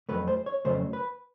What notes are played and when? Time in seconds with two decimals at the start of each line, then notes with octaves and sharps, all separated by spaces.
0.09 F2 C#3 F#3 A3 B4
0.28 C5
0.46 C#5
0.65 F2 C#3 F#3 A3 C5
0.93 B4